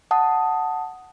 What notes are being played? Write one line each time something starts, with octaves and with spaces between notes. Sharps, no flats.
F#5 A5 D#6